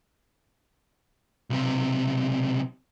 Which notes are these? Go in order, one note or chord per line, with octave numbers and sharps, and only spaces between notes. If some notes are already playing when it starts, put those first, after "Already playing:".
B1 C3